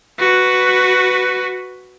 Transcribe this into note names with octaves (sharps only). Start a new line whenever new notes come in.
F#4 B4